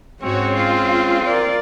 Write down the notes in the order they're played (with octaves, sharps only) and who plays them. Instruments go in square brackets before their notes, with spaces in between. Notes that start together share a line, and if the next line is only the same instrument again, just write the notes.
[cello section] G#2 F#4 C#5 [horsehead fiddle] G#3 C#4 [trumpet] C4
[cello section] F4
[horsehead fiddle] A#4 D5